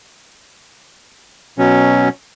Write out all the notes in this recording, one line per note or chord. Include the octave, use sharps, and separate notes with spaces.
B2 F#3 C#4